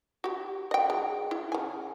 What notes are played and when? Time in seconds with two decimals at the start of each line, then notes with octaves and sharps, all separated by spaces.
0.24 F#4 G4
0.71 D#5 G5
0.90 G#3
1.31 E4
1.52 C#3 G#5